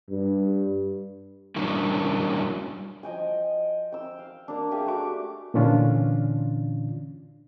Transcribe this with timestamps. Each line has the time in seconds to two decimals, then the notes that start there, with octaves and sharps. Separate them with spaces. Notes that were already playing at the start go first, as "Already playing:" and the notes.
0.10 G2
1.56 F#3 G3 A#3 C#4 D4 E4
3.03 F3 D#5 G5 G#5
3.92 G5 E6
4.19 F5
4.48 A#3 D4
4.71 G4 G#4 E5 F5
4.86 A3 F#4 D6
5.54 A#2 D3 E3 C#4 D4 F4